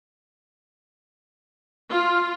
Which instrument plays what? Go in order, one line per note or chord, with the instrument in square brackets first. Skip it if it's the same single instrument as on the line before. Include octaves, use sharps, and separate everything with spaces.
[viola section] F4